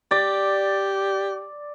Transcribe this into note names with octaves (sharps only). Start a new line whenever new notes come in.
G4 D5